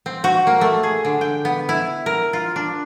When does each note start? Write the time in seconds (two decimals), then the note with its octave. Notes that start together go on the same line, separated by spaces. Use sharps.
0.06 C4
0.24 F#4
0.47 A#3
0.61 A3
0.83 G#4
1.05 D3
1.21 G5
1.45 B3
1.69 E4
2.06 A#4
2.33 F4
2.56 D4